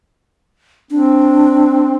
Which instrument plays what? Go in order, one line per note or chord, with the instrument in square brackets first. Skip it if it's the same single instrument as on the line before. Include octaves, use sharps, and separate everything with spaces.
[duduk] C4 [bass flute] D4